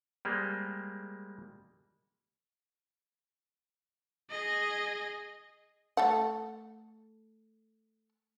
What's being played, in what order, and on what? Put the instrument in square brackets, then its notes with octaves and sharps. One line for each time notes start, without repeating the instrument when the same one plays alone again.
[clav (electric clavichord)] G3 G#3 A#3 C5
[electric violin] G#4 D#5
[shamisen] A3 A4 F#5